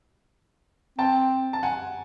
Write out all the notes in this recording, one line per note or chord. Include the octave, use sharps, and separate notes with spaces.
C4 G5 A5
A5
F#5 G#5